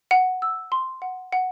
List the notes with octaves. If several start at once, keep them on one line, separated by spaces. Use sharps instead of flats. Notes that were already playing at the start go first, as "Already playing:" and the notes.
F#5
E6
C6
F#5
F#5